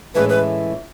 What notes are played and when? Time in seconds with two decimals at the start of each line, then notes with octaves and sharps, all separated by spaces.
0.15 A2 E3 G#3 C#4 B4
0.29 B4